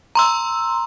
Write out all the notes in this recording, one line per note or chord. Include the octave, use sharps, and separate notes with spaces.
A#5 C6 E6